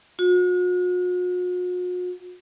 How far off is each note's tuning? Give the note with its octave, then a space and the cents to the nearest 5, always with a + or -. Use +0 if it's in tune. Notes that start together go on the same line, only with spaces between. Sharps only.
F#4 -45